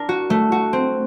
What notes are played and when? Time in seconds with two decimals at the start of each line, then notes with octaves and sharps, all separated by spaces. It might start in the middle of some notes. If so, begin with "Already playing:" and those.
Already playing: D4 A#4
0.09 F#4
0.30 A3
0.52 F#4
0.73 C4